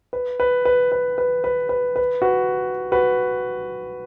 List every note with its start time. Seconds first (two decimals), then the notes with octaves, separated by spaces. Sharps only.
0.13 B4
0.40 B4
0.65 B4
0.92 B4
1.18 B4
1.44 B4
1.69 B4
1.96 B4
2.22 F#4 B4
2.92 F#4 B4